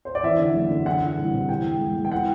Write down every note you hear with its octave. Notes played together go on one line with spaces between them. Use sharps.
C5
D5
E2 E5
D3
F#1
D3
E3 F#5
E3
C2
C3
E2 G5
E1
E1
E1
G5
E3 F#5